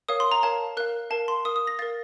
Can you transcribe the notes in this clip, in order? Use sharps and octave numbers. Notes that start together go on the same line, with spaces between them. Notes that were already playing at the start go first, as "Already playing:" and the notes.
A#4 C#5 F5 D#6
C6
A#5
A#4 C#5 F5 A5
A#4 F5 F#6
A#4 F5 A5
C6
A#4 F5 D#6
D#6
A#6
A#4 F5 A6